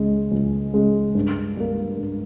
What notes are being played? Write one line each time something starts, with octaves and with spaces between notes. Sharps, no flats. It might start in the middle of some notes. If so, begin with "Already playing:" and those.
Already playing: C#2 C#3 G#3
C#2
C#3 G#3
G2
G3 A#3
G2